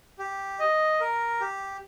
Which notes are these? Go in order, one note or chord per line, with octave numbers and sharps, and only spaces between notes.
G4
D#5
A#4
G4